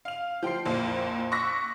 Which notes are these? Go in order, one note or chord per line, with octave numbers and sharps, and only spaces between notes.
F5 F7
F3 G5 C6 C7
A#1 F2 A#2
C#6 D6 E6 F#6 A#6 B6